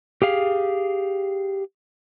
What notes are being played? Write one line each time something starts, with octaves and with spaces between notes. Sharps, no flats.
G4 G#4 F5